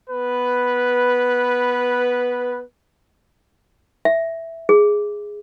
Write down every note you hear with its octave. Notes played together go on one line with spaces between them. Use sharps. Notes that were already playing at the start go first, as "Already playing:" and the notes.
B3 B4
E5
G#4